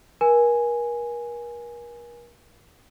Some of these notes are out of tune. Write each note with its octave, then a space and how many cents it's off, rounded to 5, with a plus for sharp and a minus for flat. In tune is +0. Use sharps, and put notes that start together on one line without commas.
A#4 +40 G#5 +0